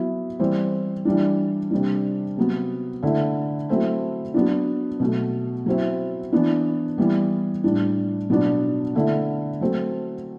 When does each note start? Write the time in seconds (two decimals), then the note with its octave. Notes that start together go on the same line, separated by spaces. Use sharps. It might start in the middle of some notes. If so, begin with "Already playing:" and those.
Already playing: F#3 B3 E4
0.39 E3 G3 C4
1.05 E3 G3 D4
1.71 C3 G3 D4
2.37 C3 F#3 B3
3.03 D3 A3 E4
3.69 F#3 A3 C4 E4
4.34 F#3 B3 D4
5.00 B2 F#3 A3
5.66 F#3 C4 E4
6.33 E3 B3 D4
6.98 E3 G3 B3
7.64 A2 G3 D4
8.30 B2 F#3 B3 D4
8.95 D3 A3 E4
9.61 F#3 A3 C4